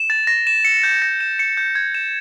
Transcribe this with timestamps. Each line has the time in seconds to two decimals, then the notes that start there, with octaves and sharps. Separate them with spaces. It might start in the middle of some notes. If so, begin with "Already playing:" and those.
Already playing: E7
0.10 A6
0.27 A#6
0.47 E7
0.65 C#7
0.83 G6
1.02 A#6
1.20 E7
1.39 C#7
1.57 G6
1.75 G#6
1.95 E7